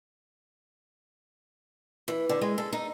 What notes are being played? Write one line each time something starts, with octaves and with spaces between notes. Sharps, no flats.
E3
D3
G#3
A4
D#4